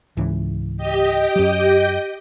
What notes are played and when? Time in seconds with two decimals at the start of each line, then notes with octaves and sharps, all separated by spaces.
0.17 C#2 G#2 E3
0.77 G4 D#5 G5
1.36 F#2 F#3